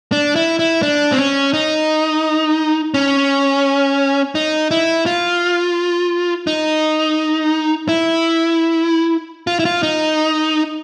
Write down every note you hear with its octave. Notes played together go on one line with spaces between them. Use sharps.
D4
E4
E4
D4
C4
C#4
D#4
C#4
D#4
E4
F4
D#4
E4
F4
E4
F4
D#4